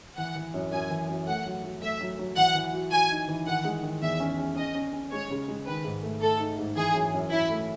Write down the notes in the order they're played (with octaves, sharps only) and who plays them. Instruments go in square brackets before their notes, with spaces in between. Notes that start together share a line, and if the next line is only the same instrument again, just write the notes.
[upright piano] E3 [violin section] F#5
[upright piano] E3
F#2
[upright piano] F#2 [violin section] G#5
[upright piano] E3
F#2
[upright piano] A3 [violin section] F#5
[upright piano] F#3
F#3
[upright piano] A3 [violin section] E5
[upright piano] F#3
F#3
[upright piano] E3 [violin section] F#5
[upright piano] E3
F#4
[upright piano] F#4 [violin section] G#5
[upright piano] D#4
E3
[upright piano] D#3 [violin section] F#5
[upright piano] G#3
D#3
[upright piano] E2 [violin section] E5
[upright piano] C#4
C#4
[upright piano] C#4 [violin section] D#5
[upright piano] C#4
C#4
[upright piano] G#3 [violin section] C#5
[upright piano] C#3
G#3
[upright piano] D#3 [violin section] B4
[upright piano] G#2
A3
[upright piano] A3 [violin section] A4
[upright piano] D#4
G#2
[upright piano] E3 [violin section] G#4
[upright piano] F#2
F#2
[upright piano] F#2 [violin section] E4
[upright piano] A3